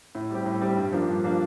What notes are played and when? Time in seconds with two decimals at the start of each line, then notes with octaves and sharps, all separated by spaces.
0.15 A2
0.30 G3 C4 G4
0.46 A2
0.61 G3 C4 G4
0.77 G2
0.92 F3 A#3 D4
1.08 G2
1.24 F3 A#3 D4